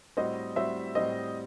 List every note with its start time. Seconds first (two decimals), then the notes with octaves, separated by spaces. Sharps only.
0.17 A2 G3 C4 F#4 C5 D#5
0.56 A2 G3 C4 F#4 C5 E5
0.95 A2 G3 C4 F#4 C5 D#5